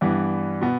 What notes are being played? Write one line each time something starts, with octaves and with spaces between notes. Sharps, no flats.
G2 E3 G3 B3
B2 B3